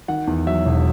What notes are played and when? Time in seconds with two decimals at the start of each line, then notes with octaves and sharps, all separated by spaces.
0.08 D#3 F#5
0.27 E2
0.46 F#3 E5
0.65 E1